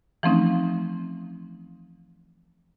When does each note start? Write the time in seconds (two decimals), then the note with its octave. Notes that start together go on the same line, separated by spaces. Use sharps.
0.23 E3 F3 A3 C4 C#4 D#4